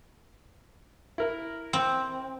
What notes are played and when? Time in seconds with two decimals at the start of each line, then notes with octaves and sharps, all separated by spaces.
1.18 E4 A#4
1.73 C4